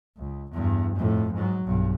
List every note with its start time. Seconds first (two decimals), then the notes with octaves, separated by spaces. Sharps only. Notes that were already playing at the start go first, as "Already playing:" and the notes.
0.17 C#2
0.53 E2 G2
0.96 F2 A2
1.35 G#2 F#3
1.65 B1 G2